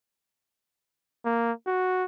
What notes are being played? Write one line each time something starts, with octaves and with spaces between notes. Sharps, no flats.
A#3
F#4